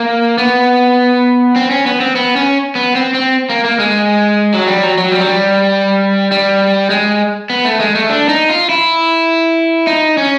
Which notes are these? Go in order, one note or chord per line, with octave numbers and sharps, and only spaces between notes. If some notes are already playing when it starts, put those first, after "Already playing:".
Already playing: A#3
B3
C4
C#4
B3
C4
B3
C#4
B3
C4
C4
A#3
A#3
G#3
F#3
G3
F#3
F#3
G3
F#3
G3
G3
G#3
B3
A3
G#3
A3
D4
D#4
F4
E4
D#4
C#4